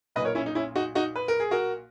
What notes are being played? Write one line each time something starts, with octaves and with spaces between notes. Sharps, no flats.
B1 A#2 B4 D#5
A#4 C#5
C#4 E4
D#4
C#4 E4
D#4 F#4
D#4 F#4
B4
A#4
G#4
F#4 A#4